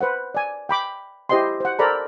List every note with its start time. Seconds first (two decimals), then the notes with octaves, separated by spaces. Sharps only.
0.01 B4 C5 F#5
0.35 D5 G#5
0.69 G5 B5 D6
1.29 E4 G4 C5 D#5 G5 C6
1.60 C5 F#5
1.79 A4 A#4 C5 D5 A#5 B5